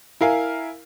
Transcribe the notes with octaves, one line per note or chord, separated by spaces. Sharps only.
E4 A#4 F5 G#5